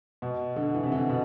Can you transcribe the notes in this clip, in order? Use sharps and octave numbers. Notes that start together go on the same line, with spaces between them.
B2
D3
E3
C3
D3
B2